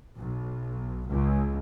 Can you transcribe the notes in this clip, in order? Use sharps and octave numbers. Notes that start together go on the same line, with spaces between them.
B1
C#2